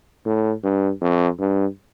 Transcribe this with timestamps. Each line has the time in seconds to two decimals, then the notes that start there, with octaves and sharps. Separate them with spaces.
0.26 A2
0.64 G2
1.01 F2
1.39 G2